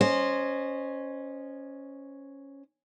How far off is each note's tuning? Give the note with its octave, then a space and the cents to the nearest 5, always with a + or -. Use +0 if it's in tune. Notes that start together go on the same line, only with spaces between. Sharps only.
C#4 +0 C5 +0 D#5 -25